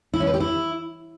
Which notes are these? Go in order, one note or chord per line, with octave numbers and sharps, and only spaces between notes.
E4
C#4
B4
G4
E4